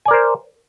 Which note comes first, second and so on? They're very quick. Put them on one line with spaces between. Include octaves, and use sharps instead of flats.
G#5 D5 A#4 C5